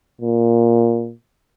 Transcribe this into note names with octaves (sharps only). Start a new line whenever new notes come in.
A#2